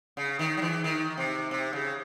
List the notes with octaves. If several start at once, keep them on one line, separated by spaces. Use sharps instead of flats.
C#3
D#3
F#3
E3
D#3
C3
C3
C#3